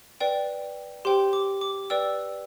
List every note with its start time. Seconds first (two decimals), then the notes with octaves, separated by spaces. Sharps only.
0.20 B4 D5 G5
1.05 G4 C5 G5 C6
1.33 D6
1.61 D6
1.90 B4 D5 G5 E6